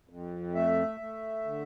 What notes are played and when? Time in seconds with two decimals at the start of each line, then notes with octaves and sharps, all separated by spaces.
0.09 F2
0.55 A3 E5
1.00 A3
1.45 D3